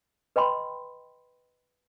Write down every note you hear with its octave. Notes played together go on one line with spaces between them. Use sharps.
B4 D#5 G5 B5 C6